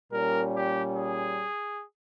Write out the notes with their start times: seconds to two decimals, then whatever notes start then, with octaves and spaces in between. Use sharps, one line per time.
0.12 A#2 G3 C#4 A#4
0.54 G4
0.96 G#4